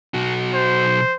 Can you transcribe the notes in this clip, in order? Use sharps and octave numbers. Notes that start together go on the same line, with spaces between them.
B1 F#4
C5